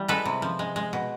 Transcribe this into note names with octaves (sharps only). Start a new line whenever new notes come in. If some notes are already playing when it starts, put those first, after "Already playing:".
Already playing: E3 G3
G#3 A4 B4
C3
F3
G#3
G#3
B2